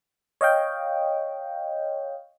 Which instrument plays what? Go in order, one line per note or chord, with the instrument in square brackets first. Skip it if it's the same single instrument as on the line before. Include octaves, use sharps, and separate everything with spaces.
[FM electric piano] C#5 D#5 F5 G5